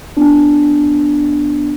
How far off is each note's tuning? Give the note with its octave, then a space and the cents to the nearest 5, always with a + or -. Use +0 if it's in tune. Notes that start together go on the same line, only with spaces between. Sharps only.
B3 +0 D4 +0